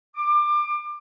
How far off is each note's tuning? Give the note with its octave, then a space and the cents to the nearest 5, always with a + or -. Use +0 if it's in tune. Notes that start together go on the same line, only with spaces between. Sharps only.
D6 +25